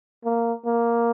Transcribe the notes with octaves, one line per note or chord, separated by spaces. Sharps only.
A#3
A#3